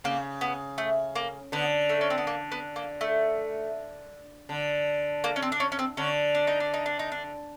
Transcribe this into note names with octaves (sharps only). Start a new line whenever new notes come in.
C#3 A#3
B3
A3
A#3
D3 B3
A3
C#4
C4
B3
A#3
B3
A#3
A3
D3
A#3
C#4
C4
D4
C#4
C#4
C4
D3 C#4
D4
D#4
D4
D#4
D4
D#4
D4